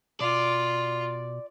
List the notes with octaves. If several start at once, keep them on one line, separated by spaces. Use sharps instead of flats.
B2 F4 D5